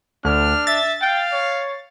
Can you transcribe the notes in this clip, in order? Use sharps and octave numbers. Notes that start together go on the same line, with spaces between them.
D2 D4 F6
E5 A6
F5 G5
C#5